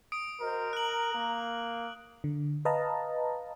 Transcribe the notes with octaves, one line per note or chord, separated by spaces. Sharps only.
D#6 D7
F#4 A#4 C5 D#5
A#5 F#6 F#7
A#3
D3
B4 D#5 F5 A5 A#5